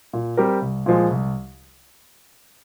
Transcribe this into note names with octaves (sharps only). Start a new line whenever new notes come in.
A#2
G3 C4 G4 A#4
C2
A#2 F3 G#3
C2